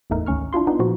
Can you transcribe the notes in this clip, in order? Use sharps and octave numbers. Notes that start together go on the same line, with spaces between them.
G1 E2 A2 A3 D#4 A#4
G#1 D2 C#4 C#6 F6
D4 E4 F4 C6
B3 D4 D#4 F4
A#2 F3 F#4